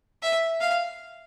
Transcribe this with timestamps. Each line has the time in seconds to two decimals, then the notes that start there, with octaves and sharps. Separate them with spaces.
0.23 E5
0.61 F5